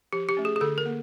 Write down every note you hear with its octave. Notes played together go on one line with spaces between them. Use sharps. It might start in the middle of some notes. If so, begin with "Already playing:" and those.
F3 G4
G4
A3 C#4
G#4
G#4
D3 A4
A#4
A#3